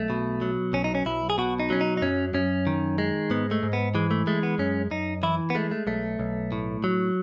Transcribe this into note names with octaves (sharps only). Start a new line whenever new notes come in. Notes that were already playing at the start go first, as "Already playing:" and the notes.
Already playing: B1 A3
B2
F#3
B1 C#4
D#4
C#4
B1 E4
G#4
B2 F#4
D#4
F#3 C#4
D#4
D#4
F#2 C#4
F#2 C#4
D#3
G#3
G#2 B3
A3
G#2
B3
E3 G#3
A3
G#3 A3
B3
F#2 C#4
F#2 D#4
E3 E4
B3
G#3 A3
A3
B1 A3
B1
A2
F#3